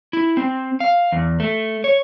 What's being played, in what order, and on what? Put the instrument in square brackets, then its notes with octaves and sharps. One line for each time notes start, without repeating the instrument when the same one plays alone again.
[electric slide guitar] E4
C4
F5
E2
A3
C#5